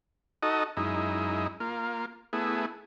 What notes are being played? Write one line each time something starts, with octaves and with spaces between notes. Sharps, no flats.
D#4 F#4 A4 D#5
F#2 G#3 D#4 E4
A#3 F4
A3 B3 E4 G#4